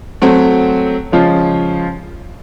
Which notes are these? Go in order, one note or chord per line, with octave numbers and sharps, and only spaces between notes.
F#3 A3 C4
C#3 F3 G#3 C#4 F4